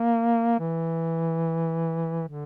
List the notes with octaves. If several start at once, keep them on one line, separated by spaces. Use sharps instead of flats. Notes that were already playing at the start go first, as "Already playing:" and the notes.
Already playing: A#3
E3
D3